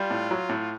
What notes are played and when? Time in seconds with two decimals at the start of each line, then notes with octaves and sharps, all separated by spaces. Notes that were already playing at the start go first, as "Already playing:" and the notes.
Already playing: G3 F4
0.11 A2
0.31 F#3
0.49 A2